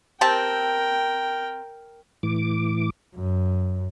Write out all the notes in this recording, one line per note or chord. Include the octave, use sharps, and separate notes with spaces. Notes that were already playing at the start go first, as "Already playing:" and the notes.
C4 G4 A#4 G5 A5
A2 E3 D6
F#2